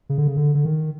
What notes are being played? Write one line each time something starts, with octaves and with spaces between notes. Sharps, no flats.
C#3
D3
C#3
D3
D3
D#3